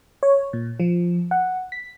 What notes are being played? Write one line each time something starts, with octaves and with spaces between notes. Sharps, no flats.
C#5
A#2
F3
F#5
B6